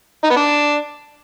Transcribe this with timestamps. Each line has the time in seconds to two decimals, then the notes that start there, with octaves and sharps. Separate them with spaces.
0.24 D#4
0.30 B3
0.37 D4